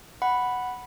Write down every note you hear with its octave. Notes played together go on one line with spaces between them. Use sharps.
F#5 B5